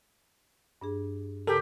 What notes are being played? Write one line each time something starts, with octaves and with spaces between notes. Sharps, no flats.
G2 D4 G#4
C#3 G4 A4 A#4